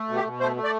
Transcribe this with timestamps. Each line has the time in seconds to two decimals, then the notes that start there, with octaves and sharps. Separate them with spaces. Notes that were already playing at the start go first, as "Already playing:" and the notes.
Already playing: A3
0.08 B2
0.16 G4
0.24 B2
0.40 A3 C5
0.56 A3
0.64 D5